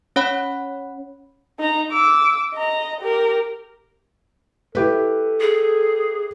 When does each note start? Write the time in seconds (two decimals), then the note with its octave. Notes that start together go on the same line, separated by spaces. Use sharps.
0.16 C#4 C#5 F#5 B5
1.59 D#4 A#5
1.91 D6 E6
2.54 D#5 A#5
3.01 G4 A#4
4.75 E4 G4 A4 B4
5.41 G#4